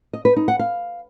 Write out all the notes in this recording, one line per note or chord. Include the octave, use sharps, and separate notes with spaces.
D#5
B4
D#4
F#5
F5